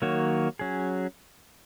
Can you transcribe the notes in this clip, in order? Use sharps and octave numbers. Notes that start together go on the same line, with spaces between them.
D#3 F#3 A#3 F#4 C#5
F#3 C#4 G#4